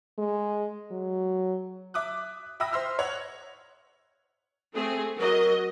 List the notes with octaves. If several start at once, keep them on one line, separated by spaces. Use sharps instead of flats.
G#3
F#3
E5 D6 D#6 F#6
E5 G5 B5 D#6 E6 A#6
C5 E5 C6 E6 F6
C#5 F#5
A3 C4 G#4
F#3 F#4 A#4 D#5